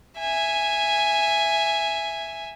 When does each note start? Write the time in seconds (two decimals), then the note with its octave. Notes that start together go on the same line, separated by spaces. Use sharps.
0.18 E5 G#5